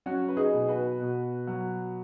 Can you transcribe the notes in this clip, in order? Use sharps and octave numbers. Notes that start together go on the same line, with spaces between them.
F#3 C#4 F#4
B4
D#4 G#4
B2
F#4 B4
B2
F#3